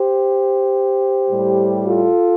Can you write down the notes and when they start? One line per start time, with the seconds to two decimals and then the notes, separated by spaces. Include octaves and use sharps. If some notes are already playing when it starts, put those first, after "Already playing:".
Already playing: G4 C5
1.28 A2 G3
1.86 F4 A4